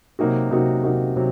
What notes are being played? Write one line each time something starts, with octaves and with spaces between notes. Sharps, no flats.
C3 F#3 A#3 D#4 F#4
C3 F#3 A#3 D#4 F#4
C3 F#3 A#3 D#4 F#4
C3 F#3